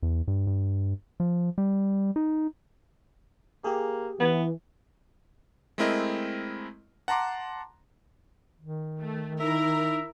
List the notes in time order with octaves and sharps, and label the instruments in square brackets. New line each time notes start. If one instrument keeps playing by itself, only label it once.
[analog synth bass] E2
G2
G2
F3
G3
D#4
[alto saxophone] A#3 [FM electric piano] G4 G#4
[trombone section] E3 [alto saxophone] B3
[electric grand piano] G#3 A3 C4 E4 A#4 D#5
F#5 A5 A#5 C6 D6
[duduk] D#3
[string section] A3
[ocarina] D#4 [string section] E4 A#4 [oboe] E5